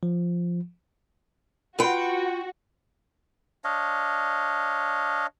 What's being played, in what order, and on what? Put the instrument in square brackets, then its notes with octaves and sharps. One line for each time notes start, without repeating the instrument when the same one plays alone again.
[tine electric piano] F3
[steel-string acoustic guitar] F4 G5 [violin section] F#4 [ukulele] B4 F#5 B5
[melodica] D4 C#5 D#5 F5